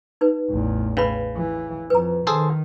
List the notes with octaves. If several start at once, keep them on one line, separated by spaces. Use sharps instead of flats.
D#4 B4
A1 E2
C#3 C#4 B4 B5
E3
F2 B4 A#5
D#3 G#4 A4 C5